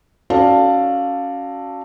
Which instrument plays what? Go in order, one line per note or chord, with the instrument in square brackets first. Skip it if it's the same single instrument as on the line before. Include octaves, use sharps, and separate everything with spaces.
[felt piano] C#4 F#4 A4 D5 F5 A5